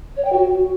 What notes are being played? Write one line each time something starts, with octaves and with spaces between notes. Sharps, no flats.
C#5
G5
F#4